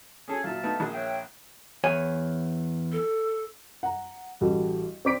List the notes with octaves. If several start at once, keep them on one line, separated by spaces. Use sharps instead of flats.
C#4 G#4 A4
A#2 F#3 E5 F5 A5
A3 B3 D#4
A#1 G#4
C#5 E5 G5
E2 C#5 G#5
A4
F#5 A#5
A1 G3 F#4 A4
C4 D5 D6 B6 D7